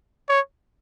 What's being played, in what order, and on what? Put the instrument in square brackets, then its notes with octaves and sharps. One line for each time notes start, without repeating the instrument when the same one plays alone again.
[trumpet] C#5